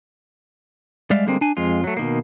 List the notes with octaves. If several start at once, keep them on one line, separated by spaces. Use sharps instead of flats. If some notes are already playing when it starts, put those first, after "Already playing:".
G3 G#3 D5 E5 F5
D3 G3 G#3 A#3 C4
D4 G#5
F2 G#3 F4
F#3 A3
B2 D#3 A#3